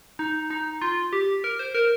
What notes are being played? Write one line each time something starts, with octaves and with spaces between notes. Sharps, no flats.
D#4
D#4
F4
G4
A#4
C5
A#4